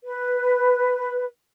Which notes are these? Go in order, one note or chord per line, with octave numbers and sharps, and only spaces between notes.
B4